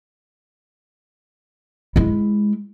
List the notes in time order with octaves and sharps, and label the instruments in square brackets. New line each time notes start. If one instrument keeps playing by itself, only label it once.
[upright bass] G#3 E4